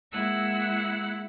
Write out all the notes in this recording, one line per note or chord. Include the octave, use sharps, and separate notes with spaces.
G#3 A#3 E4 F#5 E6 F#6